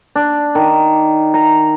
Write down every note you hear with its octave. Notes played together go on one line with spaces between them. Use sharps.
D4
D#3
A#5